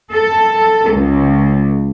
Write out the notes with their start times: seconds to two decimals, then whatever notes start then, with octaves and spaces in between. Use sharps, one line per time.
0.12 A4
0.90 C#2